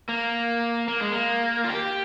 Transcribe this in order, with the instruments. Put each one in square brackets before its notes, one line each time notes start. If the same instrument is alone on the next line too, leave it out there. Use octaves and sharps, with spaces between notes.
[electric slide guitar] A#3
A#3
G#3
A#3
F4
G4